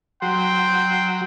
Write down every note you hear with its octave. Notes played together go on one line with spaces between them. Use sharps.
F#3 G5 C6